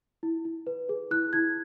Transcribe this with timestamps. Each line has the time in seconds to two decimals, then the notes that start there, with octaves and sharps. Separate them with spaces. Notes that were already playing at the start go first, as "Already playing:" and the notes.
0.23 E4
0.45 E4
0.67 B4
0.89 G#4
1.11 E4 F#6
1.33 E4 G#6